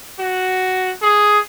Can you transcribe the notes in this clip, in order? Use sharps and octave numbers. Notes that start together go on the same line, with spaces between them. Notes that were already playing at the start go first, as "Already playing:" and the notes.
F#4
G#4